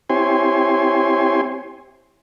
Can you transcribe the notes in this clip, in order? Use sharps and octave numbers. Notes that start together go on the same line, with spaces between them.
C4 E4 G4 C#5 G#5 C6